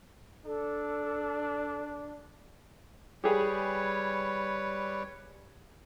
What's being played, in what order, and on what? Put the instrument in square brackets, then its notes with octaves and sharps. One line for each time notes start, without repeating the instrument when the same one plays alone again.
[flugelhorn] D4 [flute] A4
[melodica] G3 B4 C#5 [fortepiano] G4 G#4 G5